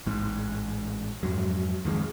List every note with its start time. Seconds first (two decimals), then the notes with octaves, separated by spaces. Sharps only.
0.06 A1 G#2
1.23 F2 G#2 F#3
1.85 F2 D#3 F3 G#3